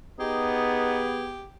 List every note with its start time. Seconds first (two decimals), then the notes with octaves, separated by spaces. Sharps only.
0.20 B3 D#4 G4 G#4